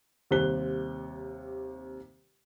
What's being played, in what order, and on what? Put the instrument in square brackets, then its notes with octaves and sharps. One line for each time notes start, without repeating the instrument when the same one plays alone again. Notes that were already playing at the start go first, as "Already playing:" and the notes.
[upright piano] D#2 C3 G3 C5 F#6 G7